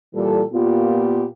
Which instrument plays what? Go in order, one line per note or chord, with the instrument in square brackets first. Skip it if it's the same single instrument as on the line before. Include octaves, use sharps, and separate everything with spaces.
[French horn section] A#2 E3 G3 A4
A#2 A#3 B3 F4 G4